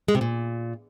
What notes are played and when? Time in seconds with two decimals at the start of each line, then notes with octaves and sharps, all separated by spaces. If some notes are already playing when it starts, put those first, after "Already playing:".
0.08 G#3
0.15 C3
0.21 A#2